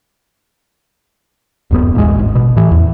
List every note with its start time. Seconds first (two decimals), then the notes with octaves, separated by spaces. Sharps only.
1.71 D1 F#2 B3
1.95 A1 D#2 G#3
2.19 G#1
2.35 B2
2.57 A2 E3
2.71 E2